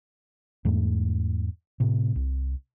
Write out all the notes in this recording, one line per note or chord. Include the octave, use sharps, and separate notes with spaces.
E2 G#2 A3
A2 C3
C2